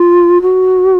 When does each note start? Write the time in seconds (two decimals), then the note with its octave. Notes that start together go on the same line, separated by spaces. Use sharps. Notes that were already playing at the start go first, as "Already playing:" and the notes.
Already playing: F4
0.42 F#4